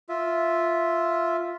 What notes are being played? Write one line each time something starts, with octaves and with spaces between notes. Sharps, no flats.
F4 E5